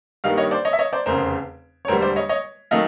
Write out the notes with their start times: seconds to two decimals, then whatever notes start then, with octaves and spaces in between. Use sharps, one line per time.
0.24 G2 D#3 G3 A#3 D#5 F5
0.37 C#5 D#5
0.51 C5 D5
0.65 C#5 D#5
0.73 E5
0.79 C#5 D#5
0.93 C5 D5
1.06 F1 E2 C#3 A#4 C5
1.85 C#5
1.88 E1 D2 D3 G3 A#4 C5
2.02 C5 D5
2.16 C#5 D#5
2.29 C#5 D#5
2.71 D#3 F#3 A3 D#5 F5